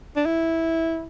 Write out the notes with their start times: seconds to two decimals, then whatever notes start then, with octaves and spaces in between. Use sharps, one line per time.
0.16 D4
0.26 E4